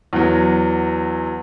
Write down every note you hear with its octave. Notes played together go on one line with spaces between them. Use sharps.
E2 F#3